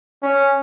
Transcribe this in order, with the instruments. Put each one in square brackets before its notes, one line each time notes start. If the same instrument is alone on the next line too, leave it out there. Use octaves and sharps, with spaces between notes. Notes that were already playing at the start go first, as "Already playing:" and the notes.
[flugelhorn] C#4